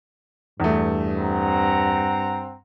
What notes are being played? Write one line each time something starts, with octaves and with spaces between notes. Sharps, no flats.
E2 G2 A3
C4 F#5 A#5